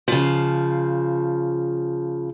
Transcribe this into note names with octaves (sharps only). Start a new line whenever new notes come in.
C#3 F3